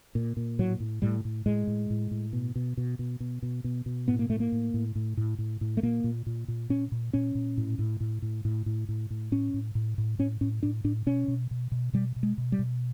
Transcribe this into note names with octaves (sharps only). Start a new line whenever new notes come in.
A#2
A#2
A2 F#3
A2
A2 G3
A2
A2 G#3
A2
A2
A2
B2
B2
B2
B2
B2
B2
B2
B2
A2 B3
A#3
A2 A3
A#3
A2
A2
A2
A2
A2
A2
A3
A#2 A#3
A#2
A#2
A#2
A#2 C#4
A#2
A#2 C#4
A#2
A2
A2
A2
A2
A2
A2
A2
A2
A2 C#4
A2
A2
A2
A2 C#4
A2 C#4
A2 D4
A2 D4
B2 C#4
B2
B2
B2
B2 G3
B2
G#3
B2
G3
B2